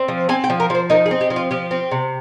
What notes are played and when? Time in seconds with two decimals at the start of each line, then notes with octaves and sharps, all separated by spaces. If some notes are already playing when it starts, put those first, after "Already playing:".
Already playing: C4
0.08 F3
0.29 C4 G#5
0.44 G5
0.50 F3
0.60 A#4
0.70 F3 C5
0.90 D#4 A#4
1.06 G#4
1.11 C4
1.21 G4
1.30 F3
1.36 F4
1.51 F3 G4
1.71 C4
1.91 C3